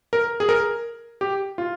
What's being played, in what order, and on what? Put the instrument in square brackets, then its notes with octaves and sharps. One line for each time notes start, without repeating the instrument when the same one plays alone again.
[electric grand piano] A#4
G#4
A#4
G4
F4